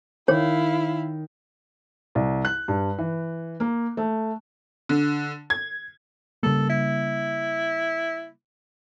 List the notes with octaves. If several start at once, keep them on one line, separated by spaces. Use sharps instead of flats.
D#3 E4 C#5 F5
C2
F#6
G2
E3
A#3
A3
D3
G#6
C#3 G3 A#3 A4
E4